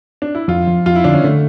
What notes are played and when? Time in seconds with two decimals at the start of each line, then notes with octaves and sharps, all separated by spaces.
0.22 D4
0.35 E4
0.48 F2 F4
0.67 F3
0.86 F2 F4
0.96 E4
1.04 D3 D4
1.14 C#4
1.24 D3 A3